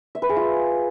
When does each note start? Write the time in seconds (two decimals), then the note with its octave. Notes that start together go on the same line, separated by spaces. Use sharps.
0.15 E5
0.22 B4
0.29 G#4
0.36 F4